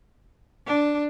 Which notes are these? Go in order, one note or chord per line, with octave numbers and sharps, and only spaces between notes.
D4